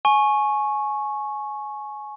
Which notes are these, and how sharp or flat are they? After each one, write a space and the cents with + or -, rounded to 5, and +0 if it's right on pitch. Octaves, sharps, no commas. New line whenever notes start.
G#5 +25 C#6 -10